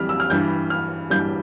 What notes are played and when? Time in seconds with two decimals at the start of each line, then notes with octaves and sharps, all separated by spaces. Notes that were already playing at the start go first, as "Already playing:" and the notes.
Already playing: F2 E3 G3 F6
0.09 E6
0.20 F6
0.30 G2 E3 G3 G6
0.70 F6
1.10 G2 E3 G3 G6